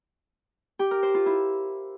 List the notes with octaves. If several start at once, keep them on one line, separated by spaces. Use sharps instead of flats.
G4
A#4
C5
F4
E4